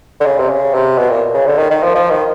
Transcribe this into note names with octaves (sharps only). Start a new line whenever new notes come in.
D3
C#3
C3
C#3
C3
B2
A#2
C#3
D3
D#3
D#3
F3
F3
D#3